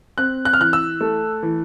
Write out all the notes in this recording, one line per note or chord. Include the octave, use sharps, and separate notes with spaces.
C4 F#6
F#6
F6
E3 F#6
E6
A3
E3